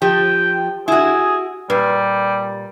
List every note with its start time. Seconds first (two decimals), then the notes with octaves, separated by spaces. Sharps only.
0.02 F3 G4 G5
0.88 E4 F#4 G#4
1.70 A#2 G3 B4